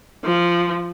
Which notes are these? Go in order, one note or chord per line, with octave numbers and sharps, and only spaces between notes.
F3